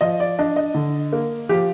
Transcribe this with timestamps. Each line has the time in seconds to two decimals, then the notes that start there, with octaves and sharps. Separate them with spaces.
0.01 F3 D#5
0.20 D5
0.39 D4 D#5
0.56 D#5
0.74 D3
1.12 A#3
1.49 F3 G4